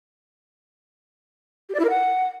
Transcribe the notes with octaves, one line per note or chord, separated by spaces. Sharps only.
G4
D5
E4
A#4
F#5